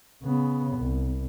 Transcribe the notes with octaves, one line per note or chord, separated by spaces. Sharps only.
C#3 B3
C2